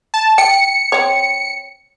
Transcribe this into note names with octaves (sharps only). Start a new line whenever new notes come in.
A5
G5 C#7
C4 C#5